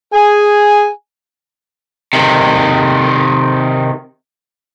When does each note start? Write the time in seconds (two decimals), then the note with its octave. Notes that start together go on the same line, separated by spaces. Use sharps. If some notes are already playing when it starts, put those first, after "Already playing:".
0.14 G#4 G#5
2.13 C3 D#3